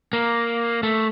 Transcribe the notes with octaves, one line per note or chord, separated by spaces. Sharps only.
A#3
A3